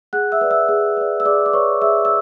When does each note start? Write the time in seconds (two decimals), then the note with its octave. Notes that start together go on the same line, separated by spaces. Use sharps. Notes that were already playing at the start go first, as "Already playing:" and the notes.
0.13 G#4 F#5 F#6
0.32 E5 E6
0.41 B4 D5
0.50 E5 E6
0.69 G#4
0.97 B4 D5
1.20 E6
1.25 G#4 D5 D6
1.46 D6
1.53 B4 C#5 D5 C#6
1.81 G#4 E5 E6
2.05 E6